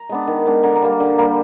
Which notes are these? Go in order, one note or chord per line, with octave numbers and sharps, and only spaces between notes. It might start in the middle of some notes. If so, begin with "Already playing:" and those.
Already playing: A#5
G#3 B3 D4
D#3
G#3 B3 D4
D3 A#5
A#5
G3 A#3
D3
G3 A#3